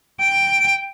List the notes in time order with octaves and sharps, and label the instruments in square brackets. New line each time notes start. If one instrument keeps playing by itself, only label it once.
[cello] G5